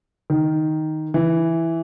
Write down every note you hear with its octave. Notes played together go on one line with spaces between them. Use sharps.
D#3
E3